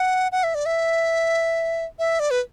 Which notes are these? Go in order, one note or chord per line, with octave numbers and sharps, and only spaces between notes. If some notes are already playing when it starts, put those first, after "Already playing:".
Already playing: F#5
F#5
E5
D5
E5
E5
D5
B4